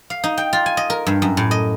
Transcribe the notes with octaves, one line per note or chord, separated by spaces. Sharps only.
F5
D#4
G5
F4
G#5
D#5
A#4
G2
F#2
A2
D#5